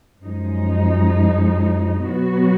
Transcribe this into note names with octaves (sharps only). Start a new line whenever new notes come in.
F#2 F3 G#3 D#4
B2 F#3 B3 F#4